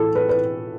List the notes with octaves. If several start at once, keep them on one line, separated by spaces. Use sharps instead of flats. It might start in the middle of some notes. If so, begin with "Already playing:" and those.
Already playing: A2 E3 A4
B4
B4